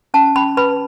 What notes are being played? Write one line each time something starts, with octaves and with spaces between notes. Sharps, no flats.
C#4 A5
C#4 B5
B4 B5